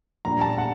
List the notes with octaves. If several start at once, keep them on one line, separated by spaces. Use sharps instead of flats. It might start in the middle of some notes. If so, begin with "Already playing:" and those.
A#2 G3 D4 A#5
A5
F#5